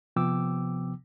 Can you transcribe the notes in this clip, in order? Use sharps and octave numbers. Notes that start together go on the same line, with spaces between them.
C3 F3 B3 G5 D6 E6